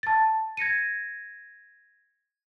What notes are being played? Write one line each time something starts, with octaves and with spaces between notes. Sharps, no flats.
A5 A6
G#6 A#6 C#7 D#7